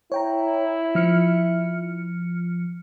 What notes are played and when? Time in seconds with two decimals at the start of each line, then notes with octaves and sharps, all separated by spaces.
0.12 E4 C#5 G5 A#5
0.95 F3 F6 C#7